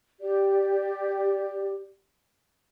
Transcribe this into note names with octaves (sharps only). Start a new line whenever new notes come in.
G4 D5